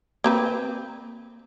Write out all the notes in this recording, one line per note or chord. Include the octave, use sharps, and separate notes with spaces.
A#3 C4 B4